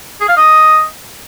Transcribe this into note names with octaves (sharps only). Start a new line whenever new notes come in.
G#4
F5
D#5